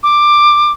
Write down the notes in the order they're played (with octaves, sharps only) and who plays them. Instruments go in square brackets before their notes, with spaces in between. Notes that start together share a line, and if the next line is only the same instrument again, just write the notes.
[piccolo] D6